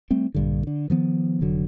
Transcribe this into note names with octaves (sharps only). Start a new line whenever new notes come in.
G3 A3 C4
A#1 G2 D3
D3
D#3 F3 B3
F1 D3 F#3